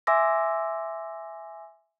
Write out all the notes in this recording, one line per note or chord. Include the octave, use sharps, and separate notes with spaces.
E5 G#5 C6 D6 E6 A#6